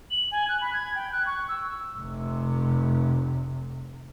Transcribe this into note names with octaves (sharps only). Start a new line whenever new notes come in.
F#7
G#5
F#6
B5
G#6
G5
F#6
C#6
E6
F1 C3